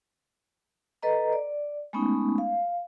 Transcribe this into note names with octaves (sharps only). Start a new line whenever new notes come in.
A4 B4 D#5 A#5
D5
G#3 A3 B3 C#4 D#4
F5